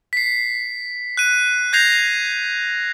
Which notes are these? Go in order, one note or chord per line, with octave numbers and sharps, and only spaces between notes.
B6 C7
F#6 D#7
G6 G#6 A#6 C7 F7